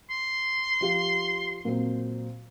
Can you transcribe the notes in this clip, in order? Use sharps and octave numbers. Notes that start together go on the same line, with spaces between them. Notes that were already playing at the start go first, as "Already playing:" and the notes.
C6
F3 G4 F5
A#2 F#3 C4